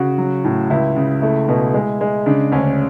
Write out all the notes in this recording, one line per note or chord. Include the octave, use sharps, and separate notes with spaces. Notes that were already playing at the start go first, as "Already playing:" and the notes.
Already playing: C#3 F#4
F#3
A2
C#2 E4
C#3
A3 E4
B2
G#3
G#3
C#3 D4
D2 C#4